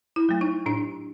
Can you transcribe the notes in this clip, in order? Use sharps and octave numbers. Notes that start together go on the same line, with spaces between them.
E4
F#3 A3
D#4
A2 D4